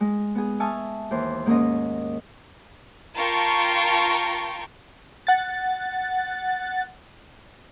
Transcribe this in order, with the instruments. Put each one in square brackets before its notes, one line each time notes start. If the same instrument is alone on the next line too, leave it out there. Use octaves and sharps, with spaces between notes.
[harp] G#3
B3 G#4
E5 G#5 A5 C#6 D#6 F6
D#2 E3 C5
G#2 A#3 C#4 D#4 D#5
[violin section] F4 A#4 G5 A5 A#5 C#6
[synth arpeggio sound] F#5 A6